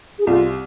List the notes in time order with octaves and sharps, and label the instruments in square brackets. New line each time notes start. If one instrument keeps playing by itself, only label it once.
[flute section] G#4
[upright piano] C2 [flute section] F4